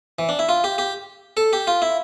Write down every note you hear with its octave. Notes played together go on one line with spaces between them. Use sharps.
E3
D4
E4
F4
G4
G4
A4
G4
F4
E4